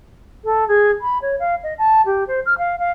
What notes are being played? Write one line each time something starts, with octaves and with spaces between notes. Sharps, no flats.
A4
G#4
B5
C#5
F5
D#5
A5
G4
C5
F6
F5
F5